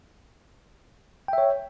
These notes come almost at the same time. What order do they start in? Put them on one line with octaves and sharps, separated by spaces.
G5 E5 C#5